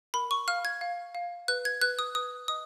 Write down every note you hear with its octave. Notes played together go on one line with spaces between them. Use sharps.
A#4 B5
C#6
F5 F6
G#6
F5
F5
B4 F#6
G#6
B4 F#6
D#6
B4 D#6
D#5 D#6